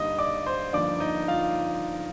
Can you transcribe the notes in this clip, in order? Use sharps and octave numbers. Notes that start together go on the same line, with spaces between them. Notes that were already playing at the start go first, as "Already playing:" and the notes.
Already playing: G2 D3 G3 A#3 D#4 D#5 D#6
D5 D6
C5 C6
G2 D3 F3 A#3 D#4 D5 D6
D#4 D#5
F4 F5